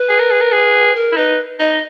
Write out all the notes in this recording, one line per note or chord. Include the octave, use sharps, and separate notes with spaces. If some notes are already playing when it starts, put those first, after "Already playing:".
Already playing: B4
G#4
A#4
G#4
A#4
G#4
A#4
E4
D#4 B4
D#4 D#5